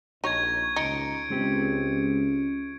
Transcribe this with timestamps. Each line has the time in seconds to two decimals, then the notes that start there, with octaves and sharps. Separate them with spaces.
0.24 A#1 D#4 C#5 C#6 G#6
0.76 C#2 D#4 C#7 D7
1.30 C#2 G#3 C4 C#4 G4